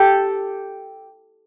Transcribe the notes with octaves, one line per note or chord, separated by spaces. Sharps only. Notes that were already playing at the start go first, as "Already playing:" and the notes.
Already playing: G4 A4